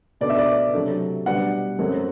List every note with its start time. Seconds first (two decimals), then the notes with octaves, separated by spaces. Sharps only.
0.21 B2 A3 D4 D5
0.30 E5
0.38 D5
0.73 C3 F#3 A3 D4
1.26 B2 G3 B3 D4 F#5
1.79 F#2 F#3 A3 C4